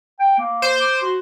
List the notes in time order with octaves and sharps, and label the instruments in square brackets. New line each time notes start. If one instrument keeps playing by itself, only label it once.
[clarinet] G5
A#3
[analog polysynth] C5
[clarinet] D6
F#4